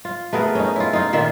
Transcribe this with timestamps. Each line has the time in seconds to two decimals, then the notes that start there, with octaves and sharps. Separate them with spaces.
0.05 F4
0.33 A3 B3 G#4 A#4
0.55 C#4 D#4
0.76 E4 F4
0.93 D#4 F4
1.13 A#2 D#3 F4 E5